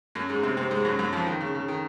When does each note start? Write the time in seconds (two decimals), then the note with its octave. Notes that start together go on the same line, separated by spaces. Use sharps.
0.15 F#2 F#3
0.29 G#2 G#3
0.43 C3 C4
0.57 C3 C4
0.71 G#2 G#3
0.85 F#2 F#3
0.99 F#2 F#3
1.13 F2 F3
1.27 D#3
1.41 C#3
1.55 C#3
1.68 D#3